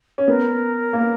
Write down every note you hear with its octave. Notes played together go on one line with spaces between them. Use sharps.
C#4
B3 A#4
A#3